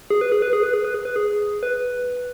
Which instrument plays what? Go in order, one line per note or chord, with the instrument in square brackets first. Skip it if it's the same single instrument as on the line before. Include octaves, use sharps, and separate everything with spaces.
[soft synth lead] G#4
B4
G#4
B4
G#4
B4
G#4
B4
G#4
B4
G#4
B4